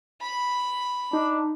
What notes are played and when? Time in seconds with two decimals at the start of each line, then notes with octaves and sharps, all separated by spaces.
0.21 B5
1.13 D4 D#4